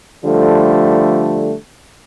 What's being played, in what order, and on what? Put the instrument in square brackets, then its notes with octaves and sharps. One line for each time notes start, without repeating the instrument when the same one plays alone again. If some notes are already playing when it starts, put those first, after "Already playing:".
[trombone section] D3 F3 G3 A3